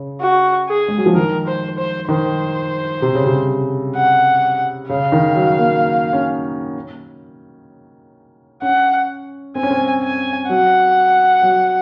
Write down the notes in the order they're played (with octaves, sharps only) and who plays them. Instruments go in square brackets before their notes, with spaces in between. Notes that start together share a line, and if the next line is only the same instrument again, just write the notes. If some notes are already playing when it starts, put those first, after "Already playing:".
Already playing: [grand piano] C#3
[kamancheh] F#4
G#4
[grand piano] G#3
F#3
F3
[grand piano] D#3 [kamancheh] A#4
[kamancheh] C5
C5
[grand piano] D#3 [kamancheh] C5
[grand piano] C3
C#3
C3
[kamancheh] F#5
[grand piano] C#3 [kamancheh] F5
[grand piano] D#3
F#3
A#3
C#4
[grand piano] C#4 [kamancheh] F#5
[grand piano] C4 [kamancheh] G#5
[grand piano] C#4
C4
[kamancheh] G#5
[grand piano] F#3 [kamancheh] F#5
[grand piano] F#3